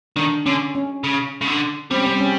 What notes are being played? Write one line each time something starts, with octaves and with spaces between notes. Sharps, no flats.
D#3 D4
D3 C#4
C#4
C#3
C#3
D3
G3 C4
C#4
C4
C#4